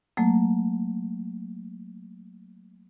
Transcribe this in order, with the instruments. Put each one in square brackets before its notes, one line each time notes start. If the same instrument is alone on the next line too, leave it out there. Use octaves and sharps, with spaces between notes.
[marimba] F#3 A3 A#3